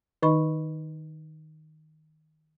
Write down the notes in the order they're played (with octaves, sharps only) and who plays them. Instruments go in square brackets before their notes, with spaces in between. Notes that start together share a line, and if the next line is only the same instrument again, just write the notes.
[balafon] D#3 D#4 D#5 B5 C#6